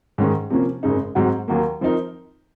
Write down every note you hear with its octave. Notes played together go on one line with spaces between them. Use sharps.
G#2 D#3 G#3 C#4
C3 F3 A#3 C#4
G#1 F#2 C#3 G#3 D#4
G#2 F#3 C4 F#4
D#2 D#3 F#3 A#3
F3 C4 D#4 A#4